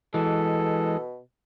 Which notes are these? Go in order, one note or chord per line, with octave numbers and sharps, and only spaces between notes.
B2 E3 G#3 A4